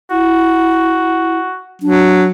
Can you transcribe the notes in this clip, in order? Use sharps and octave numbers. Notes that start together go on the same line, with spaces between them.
E4 F#4
F#3 D4